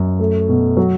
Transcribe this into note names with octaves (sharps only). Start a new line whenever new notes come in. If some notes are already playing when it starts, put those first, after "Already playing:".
Already playing: F#2
A3
B2
F#3